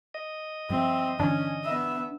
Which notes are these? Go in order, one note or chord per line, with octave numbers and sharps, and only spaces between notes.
D#5
G2 F3 G3 C4 E5
G2 D3 E3 C#4 D4
B3 E5